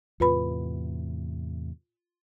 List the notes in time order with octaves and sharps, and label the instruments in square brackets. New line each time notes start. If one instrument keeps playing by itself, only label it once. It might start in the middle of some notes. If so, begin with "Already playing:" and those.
[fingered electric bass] E2 A2 C3 [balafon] F4 B4 B5